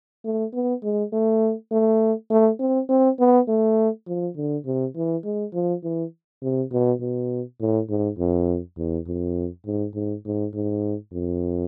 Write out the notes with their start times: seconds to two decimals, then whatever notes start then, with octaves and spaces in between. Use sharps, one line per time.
0.25 A3
0.53 B3
0.83 G#3
1.12 A3
1.72 A3
2.30 A3
2.59 C4
2.89 C4
3.19 B3
3.48 A3
4.07 F3
4.36 D3
4.66 C3
4.96 E3
5.24 G#3
5.54 F3
5.84 E3
6.42 C3
6.72 B2
7.00 B2
7.60 A2
7.89 G#2
8.18 F2
8.78 E2
9.07 F2
9.66 G#2
9.95 G#2
10.25 G#2
10.54 G#2
11.13 F2